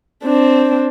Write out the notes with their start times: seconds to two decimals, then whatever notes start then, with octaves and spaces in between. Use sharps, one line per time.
0.24 C4 D4